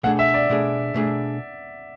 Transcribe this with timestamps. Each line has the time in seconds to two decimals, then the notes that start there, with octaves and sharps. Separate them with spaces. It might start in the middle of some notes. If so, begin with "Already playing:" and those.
0.03 B2 A3 D4 G#4 F#5
0.19 E5
0.34 D5
0.49 B2 A3 D4 G#4
0.94 B2 A3 D4 G#4